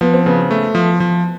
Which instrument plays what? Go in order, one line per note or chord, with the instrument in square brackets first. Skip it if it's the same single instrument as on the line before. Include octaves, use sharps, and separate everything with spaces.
[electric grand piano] F3 [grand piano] B3
[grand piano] C4
[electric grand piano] C#3 [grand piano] B3
[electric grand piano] A3
F3
F3